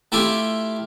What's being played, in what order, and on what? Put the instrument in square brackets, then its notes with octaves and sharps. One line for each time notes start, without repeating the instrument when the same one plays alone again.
[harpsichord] A3 E4 F4 G4